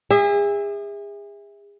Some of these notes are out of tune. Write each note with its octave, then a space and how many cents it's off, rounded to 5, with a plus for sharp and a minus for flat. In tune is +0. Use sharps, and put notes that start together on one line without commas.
G#4 -35 E5 -10